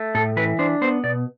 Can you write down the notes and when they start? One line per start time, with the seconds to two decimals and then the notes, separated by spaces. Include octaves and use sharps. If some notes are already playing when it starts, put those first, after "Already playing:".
Already playing: A3
0.15 A2 A4
0.36 E3 B4
0.59 D4 C5
0.81 B3 C5
1.04 B2 D5